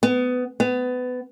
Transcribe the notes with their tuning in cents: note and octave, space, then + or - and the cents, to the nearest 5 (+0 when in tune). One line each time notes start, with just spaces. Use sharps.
B3 +20
B3 +25